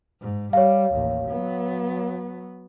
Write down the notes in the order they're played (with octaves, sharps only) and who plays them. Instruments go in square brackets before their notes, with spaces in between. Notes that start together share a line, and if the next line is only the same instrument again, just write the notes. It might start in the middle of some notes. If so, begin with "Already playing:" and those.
[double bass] G#2
[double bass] G3 [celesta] C#5 F5
[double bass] A1 D#2
F#3 B3